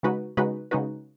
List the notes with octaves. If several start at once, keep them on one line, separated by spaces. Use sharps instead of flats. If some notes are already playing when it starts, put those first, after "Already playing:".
C#3 G#3 D#4 F#4 B4
C#3 G#3 D#4 F#4 B4
C#3 G#3 D#4 F#4 B4